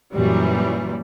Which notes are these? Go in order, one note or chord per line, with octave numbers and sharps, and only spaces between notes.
F#2 A#2 E3 F#3 G3